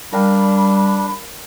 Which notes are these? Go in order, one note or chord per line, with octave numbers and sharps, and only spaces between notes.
G3 D4 A#4 F5 G5 B5